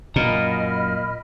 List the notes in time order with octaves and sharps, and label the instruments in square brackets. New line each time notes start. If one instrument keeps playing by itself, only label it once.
[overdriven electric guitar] F#2 A#5 [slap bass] A#2 [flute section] D#5 B5 F6